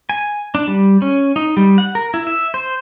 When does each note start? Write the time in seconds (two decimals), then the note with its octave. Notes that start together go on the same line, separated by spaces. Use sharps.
0.09 G#5
0.55 D4
0.68 G3
1.02 C#4
1.36 D#4
1.57 G3
1.78 F#5
1.95 A#4
2.14 E4
2.27 E5
2.54 C5